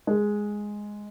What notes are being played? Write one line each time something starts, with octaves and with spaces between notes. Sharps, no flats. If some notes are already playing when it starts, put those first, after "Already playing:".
G#3